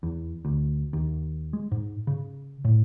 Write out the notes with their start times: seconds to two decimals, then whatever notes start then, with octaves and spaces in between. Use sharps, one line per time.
0.03 E2
0.45 D2
0.93 D#2
1.53 G#3
1.72 G#2
2.07 C#3
2.65 A2